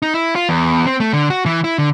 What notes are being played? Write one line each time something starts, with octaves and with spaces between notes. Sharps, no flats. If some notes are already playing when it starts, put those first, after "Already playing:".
D#4
E4
F4
E2
C4
A3
D3
F#4
E3
E4
D3